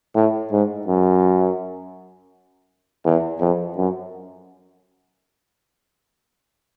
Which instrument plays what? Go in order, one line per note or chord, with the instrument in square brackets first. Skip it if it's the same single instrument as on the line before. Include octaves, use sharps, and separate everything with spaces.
[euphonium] A2
G#2
F#2
E2
F2
F#2